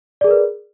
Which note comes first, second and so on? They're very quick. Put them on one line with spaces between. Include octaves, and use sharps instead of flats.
D5 G#4 A#4 B4